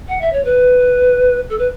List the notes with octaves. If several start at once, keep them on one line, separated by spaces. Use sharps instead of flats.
F#5
E5
C#5
B4
A4
B4